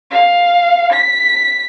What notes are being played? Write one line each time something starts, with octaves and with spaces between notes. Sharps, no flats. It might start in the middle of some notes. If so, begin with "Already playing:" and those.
F5
B6